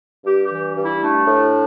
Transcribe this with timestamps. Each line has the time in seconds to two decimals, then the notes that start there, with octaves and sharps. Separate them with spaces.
0.25 G2 G4
0.44 G4
0.50 E3
0.76 G2
0.82 E4
1.01 A3 D4
1.27 A2